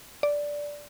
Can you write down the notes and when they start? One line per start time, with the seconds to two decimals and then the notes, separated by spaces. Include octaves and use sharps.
0.23 D5